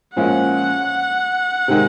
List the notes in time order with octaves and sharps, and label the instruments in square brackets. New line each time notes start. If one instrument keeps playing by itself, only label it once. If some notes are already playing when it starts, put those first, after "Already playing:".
[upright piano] A#2 F3 G#3 C#4 F4 [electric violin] F#5
[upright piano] C3 D#3 G#3